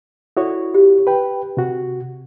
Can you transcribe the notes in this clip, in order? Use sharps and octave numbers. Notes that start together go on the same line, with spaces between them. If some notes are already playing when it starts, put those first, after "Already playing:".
E4 F#4 A4 C#5 D5
G4
B4 G5
C3 F#4